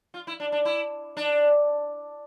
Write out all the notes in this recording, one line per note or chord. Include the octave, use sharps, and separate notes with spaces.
F4
E4
D4
D4
E4
D4